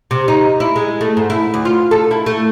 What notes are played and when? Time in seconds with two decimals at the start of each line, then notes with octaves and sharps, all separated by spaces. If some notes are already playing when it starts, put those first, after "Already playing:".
0.11 C3
0.28 D#4
0.60 E4
0.76 G#3
1.01 A3
1.17 G#2
1.30 E4
1.54 D2
1.65 F4
1.91 A4
2.11 E4
2.26 A3